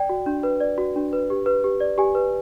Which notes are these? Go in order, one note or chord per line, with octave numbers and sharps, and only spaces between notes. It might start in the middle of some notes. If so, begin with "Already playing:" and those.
Already playing: D5 G5
F#4
D4
B4
D5
F#4
D4
B4
G4
B4
G4
D5
G4 G#5
B4